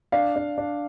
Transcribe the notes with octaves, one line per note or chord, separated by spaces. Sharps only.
D4 F5
D4
D4